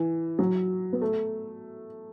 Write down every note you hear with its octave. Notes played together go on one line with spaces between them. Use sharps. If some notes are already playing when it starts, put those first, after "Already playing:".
Already playing: E3
F#3
B3
A3